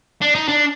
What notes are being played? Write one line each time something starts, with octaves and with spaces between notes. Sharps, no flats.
D4
D#4
D4